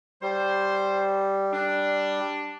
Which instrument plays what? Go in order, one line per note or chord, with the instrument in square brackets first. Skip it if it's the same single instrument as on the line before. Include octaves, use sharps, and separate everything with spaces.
[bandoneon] G3 [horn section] C5
[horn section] D4